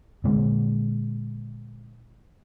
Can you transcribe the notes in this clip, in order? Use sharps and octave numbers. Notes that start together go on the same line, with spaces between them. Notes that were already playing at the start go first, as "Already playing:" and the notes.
A#2 D3 G#3